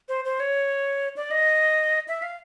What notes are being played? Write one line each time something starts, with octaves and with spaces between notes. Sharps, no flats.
C5
C5
C#5
D5
D#5
E5
F5